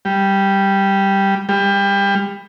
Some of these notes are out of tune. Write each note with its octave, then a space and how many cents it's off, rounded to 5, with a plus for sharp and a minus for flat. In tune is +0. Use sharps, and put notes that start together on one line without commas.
G3 +0
G3 +25